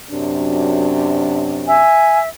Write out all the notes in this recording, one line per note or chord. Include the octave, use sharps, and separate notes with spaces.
F#2 C3 D4
E5 G#5